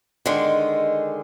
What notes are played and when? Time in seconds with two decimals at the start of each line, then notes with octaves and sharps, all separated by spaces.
0.26 D3 D#3 G#3